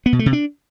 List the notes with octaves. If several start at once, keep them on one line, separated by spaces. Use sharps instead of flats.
B3
B2
A3
C3
D4